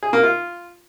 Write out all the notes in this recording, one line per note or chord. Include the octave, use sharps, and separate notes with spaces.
G#4
A#3
F4